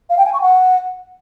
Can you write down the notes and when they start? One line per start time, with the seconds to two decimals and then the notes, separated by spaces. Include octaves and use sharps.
0.09 F5
0.17 G5
0.25 G#5
0.33 C#6
0.41 F#5